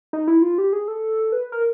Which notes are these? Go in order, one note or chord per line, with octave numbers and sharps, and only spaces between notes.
D#4
E4
F4
G4
G#4
A4
B4
A#4